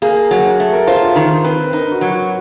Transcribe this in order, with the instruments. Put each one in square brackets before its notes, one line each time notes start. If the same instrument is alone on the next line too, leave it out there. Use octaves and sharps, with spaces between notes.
[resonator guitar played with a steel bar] A#3 [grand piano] G#4
[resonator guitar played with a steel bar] F#3
A3
[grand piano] A#4
[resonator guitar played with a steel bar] F4 [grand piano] C5
[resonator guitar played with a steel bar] D#3 [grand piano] C5
[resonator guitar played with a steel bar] C4 [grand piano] B4
[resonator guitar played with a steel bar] D#4 [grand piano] A#4
[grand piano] F#4
[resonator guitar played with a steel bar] F#3
[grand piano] F#4